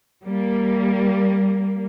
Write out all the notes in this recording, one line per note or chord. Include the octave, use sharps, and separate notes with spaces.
G3 A#3